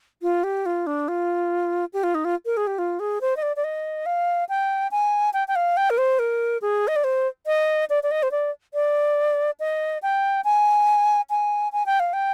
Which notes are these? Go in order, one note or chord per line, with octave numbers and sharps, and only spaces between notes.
F4
G4
F4
D4
F4
G4
F4
D#4
F4
A#4
G#4
G4
F4
G#4
C5
D#5
D5
D5
D#5
F5
G5
G#5
G5
G5
F5
G5
A#4
C5
A#4
G#4
D#5
D5
C5
D#5
D5
D5
D#5
C5
D5
D5
D#5
G5
G#5
G#5
G#5
G5
F5
G5